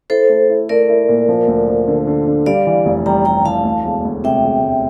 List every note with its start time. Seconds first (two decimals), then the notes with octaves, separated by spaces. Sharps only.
0.10 E4 A4 C5
0.29 A3
0.49 E4
0.69 A3 A#4 D5
0.89 E4
1.09 A#2
1.29 F3
1.48 D2
1.68 F3
1.88 D3
2.07 D3
2.27 D3
2.46 G3 D5 F5
2.67 E3
2.86 F1
3.06 G3 G5 A#5
3.25 G3 G5 A#5
3.45 E3 F5 A5
3.65 D2
3.85 E1
4.05 D2
4.24 C3 E5 G5
4.44 E1
4.64 E1